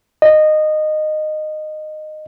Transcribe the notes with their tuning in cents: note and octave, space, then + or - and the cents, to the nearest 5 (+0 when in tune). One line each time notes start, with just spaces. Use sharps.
D#5 -15